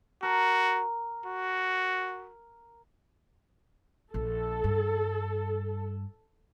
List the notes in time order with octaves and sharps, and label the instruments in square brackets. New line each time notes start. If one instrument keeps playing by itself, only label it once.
[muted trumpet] F#4 [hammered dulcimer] A#4
[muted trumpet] F#4
[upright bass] A#1 [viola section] A4
[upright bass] G2